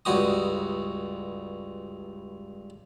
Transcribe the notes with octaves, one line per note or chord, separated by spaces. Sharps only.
C#2 G2 F#4 D#6